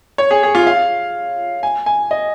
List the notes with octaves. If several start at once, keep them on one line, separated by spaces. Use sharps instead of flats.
C#5
G#4
G#4
F4
F5
G#5
G#5
D#5